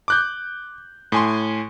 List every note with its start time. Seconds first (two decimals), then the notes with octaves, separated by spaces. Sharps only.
0.08 D6 F#6 G6
1.12 A2 G#5 C6